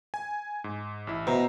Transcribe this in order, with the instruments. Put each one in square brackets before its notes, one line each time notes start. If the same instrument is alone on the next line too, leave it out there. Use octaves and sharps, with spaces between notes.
[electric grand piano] G#5
G#2
A1 E4
[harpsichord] B2 [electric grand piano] C5 E5 A#5